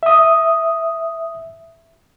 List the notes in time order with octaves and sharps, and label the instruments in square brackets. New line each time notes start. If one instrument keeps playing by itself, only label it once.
[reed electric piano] E5 D#6